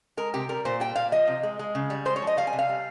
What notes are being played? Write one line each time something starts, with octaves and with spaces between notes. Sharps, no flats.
G#3 A#4
C3 G4
G3 A#4
A#2 C5
G3 G5
A#2 F5
F3 D#5
C3
G#3
G#3
C#3
G3
G#3 C5
C#5
F3
D#5
G3 F5
G#5
C3
F5
G3